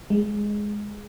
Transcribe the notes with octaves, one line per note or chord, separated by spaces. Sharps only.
G#3